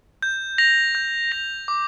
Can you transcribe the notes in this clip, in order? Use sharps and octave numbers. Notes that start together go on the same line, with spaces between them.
G6
A#6 F7
G6
A#6 F7
D6